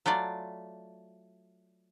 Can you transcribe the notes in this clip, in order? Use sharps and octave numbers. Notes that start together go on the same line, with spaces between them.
F#3 A3 F4 D5